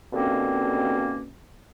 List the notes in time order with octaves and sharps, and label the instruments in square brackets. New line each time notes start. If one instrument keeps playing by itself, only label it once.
[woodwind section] D#2 B2 D3 A#3 C4 C#4